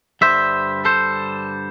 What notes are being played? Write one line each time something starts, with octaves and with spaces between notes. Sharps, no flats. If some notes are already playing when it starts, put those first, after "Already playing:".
G2 D3 G3 C5 E5
A4 C5